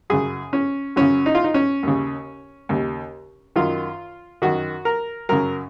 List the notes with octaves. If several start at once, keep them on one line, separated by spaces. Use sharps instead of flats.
F#2 C#3 G#4
C#4
F#2 C#3 C#4
D#4
F4
D#4
C#4
D#2 C#3
D#2 C#3
F#2 D#3 F4
F#2 D#3 F#4
A#4
F#2 C#3 A#4